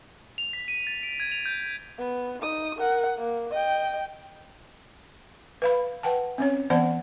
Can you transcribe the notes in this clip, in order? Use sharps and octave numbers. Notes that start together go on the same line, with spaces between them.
F7
B6
D#7
A6
D7
G#6
F7
G6
D#7
B3
D#4 D#6
A#4 F#5
A#3
D#5 G5
B4 F5 B5
B4 F#5 G5 A5
C4 C#4 C#5
E3 B3 C5 D5 F#5 A5